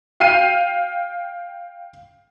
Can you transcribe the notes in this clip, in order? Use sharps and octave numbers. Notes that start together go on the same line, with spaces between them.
F5 G5 F6 C7 D#7